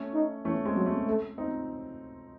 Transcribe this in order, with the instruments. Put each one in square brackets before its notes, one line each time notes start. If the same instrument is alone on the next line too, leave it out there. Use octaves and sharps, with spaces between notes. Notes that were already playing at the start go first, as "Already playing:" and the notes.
Already playing: [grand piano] A3 C#4
[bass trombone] D#4
[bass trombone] E3 [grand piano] A3 C#4
[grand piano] G#3 C4
[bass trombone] F#3
[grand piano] A3 C#4
[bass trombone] A3
[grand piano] C4 D#4